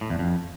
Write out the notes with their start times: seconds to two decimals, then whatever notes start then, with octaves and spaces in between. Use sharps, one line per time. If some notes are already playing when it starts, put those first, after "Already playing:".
0.01 A2
0.10 E2
0.19 F2